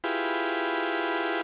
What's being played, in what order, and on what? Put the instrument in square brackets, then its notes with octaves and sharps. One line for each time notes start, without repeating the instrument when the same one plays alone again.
[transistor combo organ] E4 F4 G4 G#4 B4